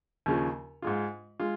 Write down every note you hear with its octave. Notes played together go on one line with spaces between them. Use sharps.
D#2 C#3 F3
G#2 G#3 F4
G#3 F4